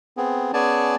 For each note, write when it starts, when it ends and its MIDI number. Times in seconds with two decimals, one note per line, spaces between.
0.17 0.51 59
0.17 0.51 60
0.17 0.51 68
0.53 0.96 59
0.53 0.96 61
0.53 0.96 68
0.53 0.96 74
0.53 0.96 80
0.53 0.96 81